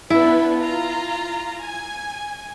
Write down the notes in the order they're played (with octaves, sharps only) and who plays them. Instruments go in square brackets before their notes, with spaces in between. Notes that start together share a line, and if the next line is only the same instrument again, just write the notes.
[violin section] B3 D4 B4 [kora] E4
[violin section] F4 A#5
G#5